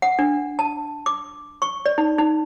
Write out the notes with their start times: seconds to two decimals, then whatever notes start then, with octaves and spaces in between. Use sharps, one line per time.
0.02 F#5
0.19 D4
0.59 A5
1.06 D6
1.62 C#6
1.86 D5
1.98 D#4
2.18 D#4